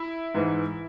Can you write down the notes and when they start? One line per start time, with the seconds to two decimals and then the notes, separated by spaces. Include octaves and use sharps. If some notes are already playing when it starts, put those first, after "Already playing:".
Already playing: E4
0.34 G#2 E3